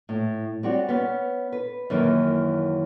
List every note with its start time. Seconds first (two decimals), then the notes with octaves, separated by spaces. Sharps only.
0.09 A2
0.63 G3 C4 F#4 C#5
0.89 B3 C#4
1.52 B4
1.90 F#2 D#3 E3 A#3